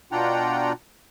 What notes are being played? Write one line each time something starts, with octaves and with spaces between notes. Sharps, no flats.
B2 D4 F4 F#5 G5 A#5